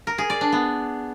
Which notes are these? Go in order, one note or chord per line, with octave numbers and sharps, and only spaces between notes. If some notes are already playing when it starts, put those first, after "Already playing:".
A#4
G#4
D5
D4
B3